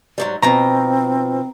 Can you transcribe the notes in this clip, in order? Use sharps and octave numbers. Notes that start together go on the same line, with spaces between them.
G#2 F#3 G3
G#2 B2 F3 C4 A#5